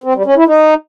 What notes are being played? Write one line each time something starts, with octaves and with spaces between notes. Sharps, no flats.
C4
G3
C#4
E4
D#4